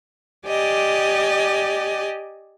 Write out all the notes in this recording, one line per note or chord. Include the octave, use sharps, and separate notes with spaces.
G4 D5 D#5 G#5